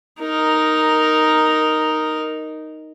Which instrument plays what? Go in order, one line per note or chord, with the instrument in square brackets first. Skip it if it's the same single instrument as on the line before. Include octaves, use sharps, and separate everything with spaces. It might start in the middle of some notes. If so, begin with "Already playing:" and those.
[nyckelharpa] D#4 A#4